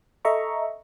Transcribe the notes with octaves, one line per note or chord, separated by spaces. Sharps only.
A4 D#5 E5 A#5 C#6